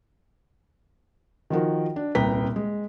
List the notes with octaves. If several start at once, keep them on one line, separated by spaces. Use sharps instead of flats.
D#3 F3 F#4 A#4
D4
D#1 C2 B4 G5 A#5 B6
G#3